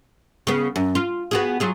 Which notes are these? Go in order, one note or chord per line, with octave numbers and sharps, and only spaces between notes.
C#3 B3
F#2
F4
B3 F#4 G#4
F#3 F4 G#4